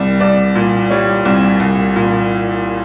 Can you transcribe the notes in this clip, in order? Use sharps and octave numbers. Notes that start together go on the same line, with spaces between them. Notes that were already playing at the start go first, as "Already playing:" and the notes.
Already playing: C2 G3 D5
C2 D5
A#2
G3 C#5
C2
C2
A#2